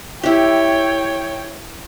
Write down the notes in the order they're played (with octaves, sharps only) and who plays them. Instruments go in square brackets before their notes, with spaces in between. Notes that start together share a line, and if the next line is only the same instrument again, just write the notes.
[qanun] E4 G4 [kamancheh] C#5 G5